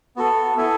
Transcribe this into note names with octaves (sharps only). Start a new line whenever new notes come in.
B3 F#4 A4
B3 E4 A4 E5 G#5